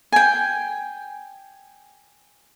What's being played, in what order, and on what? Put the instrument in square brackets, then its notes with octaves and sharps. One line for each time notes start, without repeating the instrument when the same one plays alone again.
[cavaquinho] G5 G#5